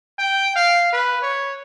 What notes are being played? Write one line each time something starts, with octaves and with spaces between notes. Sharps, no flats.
G5
F5
B4
C#5